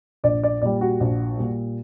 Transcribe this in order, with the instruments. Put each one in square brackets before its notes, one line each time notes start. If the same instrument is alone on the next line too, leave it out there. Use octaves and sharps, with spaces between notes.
[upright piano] A#1 D5
D5
A#2 G3 D5
F#4
A#1
A#2 G3